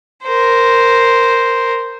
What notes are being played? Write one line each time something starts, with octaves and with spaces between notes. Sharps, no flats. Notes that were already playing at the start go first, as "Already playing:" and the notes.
A#4 C5